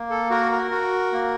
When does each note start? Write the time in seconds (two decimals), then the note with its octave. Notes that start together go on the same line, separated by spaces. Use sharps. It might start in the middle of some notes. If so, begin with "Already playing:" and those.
Already playing: A#3
0.10 A4
0.30 F#4 A#4
0.52 A#4
0.71 F#4
1.13 A#3